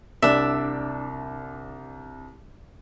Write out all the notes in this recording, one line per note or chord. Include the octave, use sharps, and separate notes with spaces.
C2 D4 D5 E5